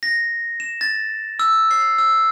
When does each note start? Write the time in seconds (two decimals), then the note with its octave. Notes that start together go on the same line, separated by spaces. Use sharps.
0.03 A#6
0.60 E7
0.81 A6
1.39 E6
1.71 C7
1.98 E6